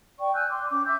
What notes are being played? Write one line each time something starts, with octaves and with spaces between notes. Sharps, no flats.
D5 G5 C#6
G#5 E6 F#6 G6
C6 D6
C#4 D6
E5 E6 G6